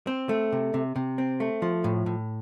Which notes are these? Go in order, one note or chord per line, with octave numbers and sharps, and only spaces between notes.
C4
A3
C3
C3
C3
C4
A3
F3
A2
A2